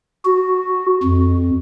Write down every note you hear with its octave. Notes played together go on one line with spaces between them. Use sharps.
F#4
F2